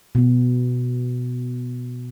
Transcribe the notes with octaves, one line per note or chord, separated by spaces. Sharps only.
B2 B3